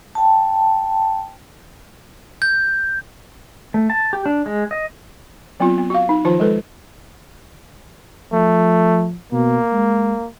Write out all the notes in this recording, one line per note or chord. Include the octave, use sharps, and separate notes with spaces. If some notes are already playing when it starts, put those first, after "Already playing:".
G5 A5
G6
A3
A5
G4
D4
G#3
D#5
F#3 B3 C4 F4
B3
F#4 F5
D#4
D#3 F3 F4 C5 A5
G#3 A4 B4
F3 A3
B2 A#3
G#3